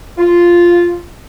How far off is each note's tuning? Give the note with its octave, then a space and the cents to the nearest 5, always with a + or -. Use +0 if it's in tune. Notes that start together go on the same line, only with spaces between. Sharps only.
F4 -5